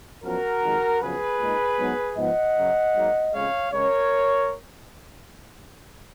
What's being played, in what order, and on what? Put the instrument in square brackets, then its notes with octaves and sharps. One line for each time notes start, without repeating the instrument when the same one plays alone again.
[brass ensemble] F#2 F3 B3 F#4 A#4
F2 D#3 G#3
F#2 C#3 F3 B3 G#4 B4
A#2 G#3 D#4
G#2 F#3 B3 D#4
G#2 F3 B3 D#5 F#5
F#2 C#3 F#3
G#2 F#3 A#3 D#4
F2 C#3 G#3 C#4 C#5 F5
C#3 G#3 C#4 A#4 C#5